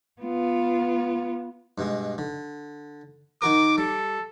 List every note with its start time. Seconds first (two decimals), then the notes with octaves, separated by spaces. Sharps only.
0.22 B3 F4
1.78 G2 B2 G#3
2.18 D3
3.42 D#3 F#4 A#4 D6
3.78 G3 A4